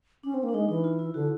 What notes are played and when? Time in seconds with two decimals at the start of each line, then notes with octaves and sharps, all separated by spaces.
0.23 C#4 D4
0.34 C4
0.43 A#3
0.49 D4
0.54 G#3 D#4
0.69 E3 D#4
0.84 F4
0.99 E4
1.14 D3 F#4